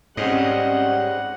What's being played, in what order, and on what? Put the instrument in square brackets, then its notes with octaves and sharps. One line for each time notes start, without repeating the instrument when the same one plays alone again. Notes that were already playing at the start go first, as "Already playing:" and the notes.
[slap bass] G#2 [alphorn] G3 [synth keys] C4 C#4 D#5 [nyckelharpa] F#5